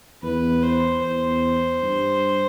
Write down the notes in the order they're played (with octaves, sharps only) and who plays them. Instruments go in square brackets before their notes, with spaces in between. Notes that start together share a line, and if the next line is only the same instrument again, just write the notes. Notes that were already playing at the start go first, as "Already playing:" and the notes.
[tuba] E2 [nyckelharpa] B4
[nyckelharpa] C5
[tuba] E2 [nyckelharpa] C5
[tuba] G2